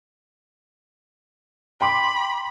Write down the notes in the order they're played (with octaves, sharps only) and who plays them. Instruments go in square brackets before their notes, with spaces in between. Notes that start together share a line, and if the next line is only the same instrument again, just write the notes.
[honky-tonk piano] G5 C6 D6 [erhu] B5